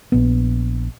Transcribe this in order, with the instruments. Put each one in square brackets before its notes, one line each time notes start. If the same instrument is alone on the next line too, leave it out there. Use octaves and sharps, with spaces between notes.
[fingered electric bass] A#1 B3